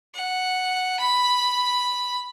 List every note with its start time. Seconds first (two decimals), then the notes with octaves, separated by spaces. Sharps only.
0.14 F#5
0.99 B5